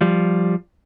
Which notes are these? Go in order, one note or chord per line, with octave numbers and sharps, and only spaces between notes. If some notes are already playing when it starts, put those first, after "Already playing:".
F3 G3